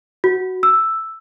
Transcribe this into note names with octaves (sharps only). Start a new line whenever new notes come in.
F#4
E6